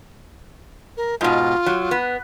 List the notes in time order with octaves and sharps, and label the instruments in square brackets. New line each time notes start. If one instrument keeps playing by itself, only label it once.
[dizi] A#4
[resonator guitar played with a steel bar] G#2 B2 [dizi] F4
[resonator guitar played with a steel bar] F#3
B3